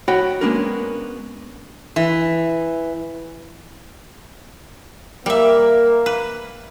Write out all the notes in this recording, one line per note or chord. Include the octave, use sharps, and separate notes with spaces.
F#4 C#5 D#5 G5 B5
G#3 A#3 B3 C#4 D4 A#4
E3
G3 A#3 E5
B4